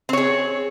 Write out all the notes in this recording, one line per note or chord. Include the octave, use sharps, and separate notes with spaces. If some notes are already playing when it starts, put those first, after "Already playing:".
C4 G#4 C#5